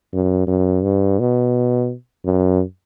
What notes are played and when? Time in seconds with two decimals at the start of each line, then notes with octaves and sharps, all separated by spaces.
0.13 F#2
0.47 F#2
0.83 G2
1.19 B2
2.25 F#2